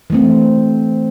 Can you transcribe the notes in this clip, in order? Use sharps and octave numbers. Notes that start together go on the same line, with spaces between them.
E3 A3 C4